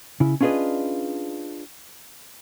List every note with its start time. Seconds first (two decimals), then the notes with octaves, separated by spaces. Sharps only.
0.20 C#3 E4
0.41 C#4 D4 F4 G#4 B4 D#5